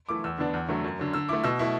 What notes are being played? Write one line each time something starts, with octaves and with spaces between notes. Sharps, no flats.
E3 A3 E4 D6
E2 E6
D3 B3 D4
E2
D3 F#3 A3
F#2
D3 F#3
D3 E6
A3 E4 D6
B2 E6
A3 E4